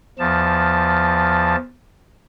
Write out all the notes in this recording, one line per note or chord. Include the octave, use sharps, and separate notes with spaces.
E2 F3 A5